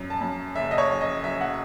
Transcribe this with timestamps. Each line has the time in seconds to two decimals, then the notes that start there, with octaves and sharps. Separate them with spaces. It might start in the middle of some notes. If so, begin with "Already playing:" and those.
Already playing: F#2
0.10 A5
0.21 F#2
0.56 F#1 E5
0.71 D#5
0.78 C#5
0.90 F#3
1.01 D#5
1.24 F#3 E5
1.41 F#5